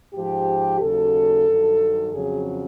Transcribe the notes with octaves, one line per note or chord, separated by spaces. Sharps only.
G#2 F3 G4
D#2 C#3 F#3 A4
G2 D#3 F#3
F2 C#3 F#3 G#4